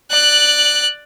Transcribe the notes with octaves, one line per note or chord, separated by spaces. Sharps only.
D5 F#6